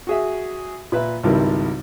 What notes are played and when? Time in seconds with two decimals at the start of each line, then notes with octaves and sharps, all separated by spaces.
0.07 F#4 G#4 E5
0.92 A#2 B4 E5
1.23 G#1 C#2 G#2 G3 E4 A#4